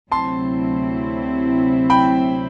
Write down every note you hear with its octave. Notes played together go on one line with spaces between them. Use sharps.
D2 C3 F#3 C4 E4 A5 C6
G5 B5